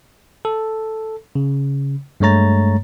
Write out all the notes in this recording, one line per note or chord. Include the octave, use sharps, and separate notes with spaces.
A4
C#3
G2 G#3 A3 C#5 A#5 A6